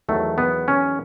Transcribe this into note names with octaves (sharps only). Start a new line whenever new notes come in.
E2 D#3 F#3 A3
B3
C#4